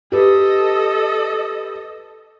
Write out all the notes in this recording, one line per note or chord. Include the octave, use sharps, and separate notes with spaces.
G4 A4 B4 D#5